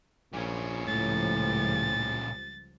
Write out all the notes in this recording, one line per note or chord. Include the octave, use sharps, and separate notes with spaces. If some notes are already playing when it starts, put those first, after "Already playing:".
A#1 A#2 C#4
C#2 A2 F3 G3 A6